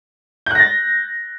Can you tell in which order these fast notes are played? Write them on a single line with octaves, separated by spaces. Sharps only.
G6 F#6 A#6 A6